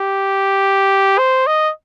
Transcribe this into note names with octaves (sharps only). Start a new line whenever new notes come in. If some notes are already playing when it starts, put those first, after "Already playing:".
Already playing: G4
C5
D#5